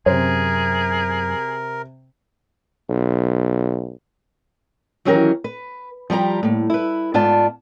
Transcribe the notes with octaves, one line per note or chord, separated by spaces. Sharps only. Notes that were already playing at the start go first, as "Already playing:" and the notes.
F#2 C3 G#4 A#4 C5
B1
D#3 E3 F#3 C#4 G4 A#4
B4
F3 G3 G4 A#5
A2 A#3
E4 B4
G#2 B3 F4 D5 A5